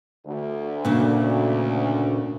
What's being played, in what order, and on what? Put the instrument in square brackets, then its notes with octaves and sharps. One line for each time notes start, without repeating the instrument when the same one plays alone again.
[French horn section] D2
[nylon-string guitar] A#2 C#3 D4